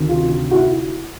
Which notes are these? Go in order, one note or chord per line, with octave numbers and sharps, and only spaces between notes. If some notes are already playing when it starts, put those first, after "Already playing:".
Already playing: D2 C3 D#3
F4
E4 F#4